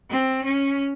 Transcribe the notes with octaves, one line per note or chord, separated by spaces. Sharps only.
C4
C#4